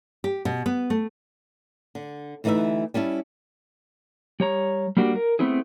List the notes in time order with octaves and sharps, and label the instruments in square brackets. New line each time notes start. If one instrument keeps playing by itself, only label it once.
[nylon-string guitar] G4
B2
B3
A3
D3
D2 E3 A3 D#4 B4 E5
G3 C#4 E4 A5
[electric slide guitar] G3 C#5 A#5
G3 A#3 D4 F#4 G4
A#4
A3 B3 C4 E4 G#4